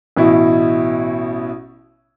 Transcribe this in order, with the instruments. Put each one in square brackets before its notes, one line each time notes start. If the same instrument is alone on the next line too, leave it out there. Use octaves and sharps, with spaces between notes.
[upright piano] A1 B2 E4